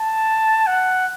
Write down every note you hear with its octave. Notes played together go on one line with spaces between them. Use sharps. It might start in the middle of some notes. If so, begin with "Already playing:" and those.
Already playing: A5
F#5